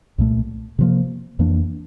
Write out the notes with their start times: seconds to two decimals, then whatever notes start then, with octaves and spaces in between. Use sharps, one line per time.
0.18 C2 A#2 A3
0.79 C3 F3 A#3
1.39 F2 E3 A#3 D4